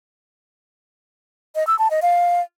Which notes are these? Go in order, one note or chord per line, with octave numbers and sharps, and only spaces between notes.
D#5
E6
A5
D#5
F5